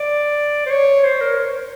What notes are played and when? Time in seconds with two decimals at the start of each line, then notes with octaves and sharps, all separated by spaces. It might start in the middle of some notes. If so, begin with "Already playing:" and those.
Already playing: D5
0.67 C5
0.71 C#5
1.04 C5
1.21 A#4
1.39 C#5
1.50 C5